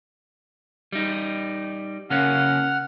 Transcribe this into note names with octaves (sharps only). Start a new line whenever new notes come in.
G3 D#4
C#3 A#3 C#4 F#5 F6